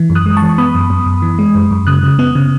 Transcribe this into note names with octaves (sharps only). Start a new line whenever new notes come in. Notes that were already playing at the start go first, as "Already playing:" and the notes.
Already playing: E3
F#2
D#6 F#6
G#3
A5 C#6
E3
C#6
B3 B5 D#6
F#2
F#2
F#2
E3
G#3
F#2
F#2
C#3 D#6 F#6
C#3
B3
C#3